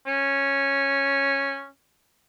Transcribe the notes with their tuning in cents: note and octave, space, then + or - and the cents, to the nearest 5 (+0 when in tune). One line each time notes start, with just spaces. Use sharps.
C#4 -5